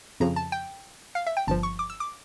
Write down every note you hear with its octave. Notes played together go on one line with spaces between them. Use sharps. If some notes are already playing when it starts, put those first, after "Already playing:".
F2 C#3 F3 A#5
A5
G5
F5
E5
G5
G1 G2 F3 A5
C#6
D6
E6
D6